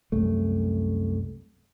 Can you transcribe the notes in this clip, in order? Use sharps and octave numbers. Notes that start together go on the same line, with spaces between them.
C2 F#2 A3